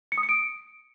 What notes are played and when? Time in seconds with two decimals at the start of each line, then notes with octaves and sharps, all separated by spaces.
0.12 C#7
0.18 D#6
0.23 C#7
0.29 D7